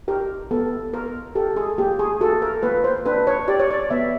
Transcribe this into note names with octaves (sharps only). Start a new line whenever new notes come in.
G4 A#4
B3 A4
B3 A#4
G4 A4
G#4
A#3 G4
G#4
F#4 A4
A#4
A#3 B4
C5
D4 B4
C#5
G4 D5
C#5
D5
B3 E5